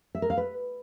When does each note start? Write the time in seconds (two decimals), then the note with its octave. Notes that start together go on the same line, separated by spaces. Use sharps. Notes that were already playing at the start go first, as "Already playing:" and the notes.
0.15 E5
0.22 A#4
0.30 F5
0.38 B4